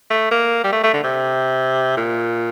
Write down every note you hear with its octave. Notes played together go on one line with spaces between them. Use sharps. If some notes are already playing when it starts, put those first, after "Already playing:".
A3
A#3
G3
A3
A3
D3
C3
A#2